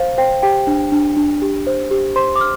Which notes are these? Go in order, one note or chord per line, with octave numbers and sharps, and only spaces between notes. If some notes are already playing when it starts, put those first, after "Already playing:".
Already playing: C5 F5
C5 G5
G4 G5
D4
D4
D4
G4
C5
G4
C5 C6
D6
F6